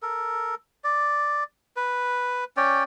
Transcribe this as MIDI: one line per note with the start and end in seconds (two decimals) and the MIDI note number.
0.02 0.55 69
0.02 0.55 70
0.84 1.44 74
1.76 2.44 71
2.57 2.84 61
2.57 2.84 73
2.57 2.84 74
2.57 2.84 79